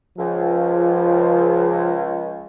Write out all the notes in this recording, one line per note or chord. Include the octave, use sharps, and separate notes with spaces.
C#2 F3